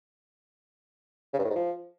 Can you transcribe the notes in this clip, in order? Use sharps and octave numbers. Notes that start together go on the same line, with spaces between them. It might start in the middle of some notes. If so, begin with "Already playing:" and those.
C#3
G2
A2
G#2
F3